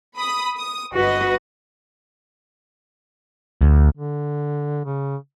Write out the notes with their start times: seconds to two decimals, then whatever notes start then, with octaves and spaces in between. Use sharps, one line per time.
0.17 B5 D#6
0.57 D#6
0.94 G1 F#4 B4 D#5
3.61 D2
3.96 D3
4.85 C#3